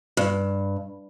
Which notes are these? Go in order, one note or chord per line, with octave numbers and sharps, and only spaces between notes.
G2